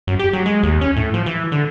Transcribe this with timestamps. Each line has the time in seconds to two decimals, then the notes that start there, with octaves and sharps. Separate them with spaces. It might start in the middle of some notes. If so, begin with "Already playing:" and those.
0.07 F#2
0.19 G4
0.33 F#3
0.46 G#3
0.63 D#2
0.81 C#4
0.96 A2
1.14 F3
1.26 E3
1.52 D3